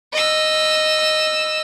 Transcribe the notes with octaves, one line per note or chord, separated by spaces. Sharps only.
D#5 E6